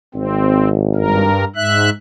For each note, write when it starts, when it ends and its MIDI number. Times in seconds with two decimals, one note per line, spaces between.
0.15 1.31 32
0.15 0.69 60
0.96 1.44 43
0.96 1.44 70
1.56 1.90 44
1.56 1.90 76
1.56 1.90 90